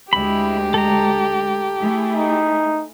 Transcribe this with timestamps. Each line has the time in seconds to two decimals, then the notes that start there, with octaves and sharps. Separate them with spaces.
0.13 D2 G#3 E4 G4 B5
0.74 A4 A#5
1.80 A3 E4 G#4
2.15 D#4